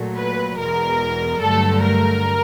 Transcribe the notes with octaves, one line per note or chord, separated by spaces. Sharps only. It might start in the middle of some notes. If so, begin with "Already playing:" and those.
Already playing: A#2 F#3 A3
B4
E2 B2 G#3 A#4
G2 D3 F#3 A3 A4
A#4